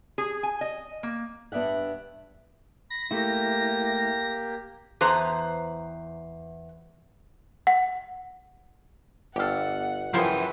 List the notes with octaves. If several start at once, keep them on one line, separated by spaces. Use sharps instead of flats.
G#4
G#5
D#5
A#3
G2 B3 D5 E5 F#5
B5 A#6
A3 A#3 E4 G4
E2 B4 C5 A#5
F#5
G1 G4 A4 F5 F#5
F#2 F3 G3 E4 G#4 B4 C5 G5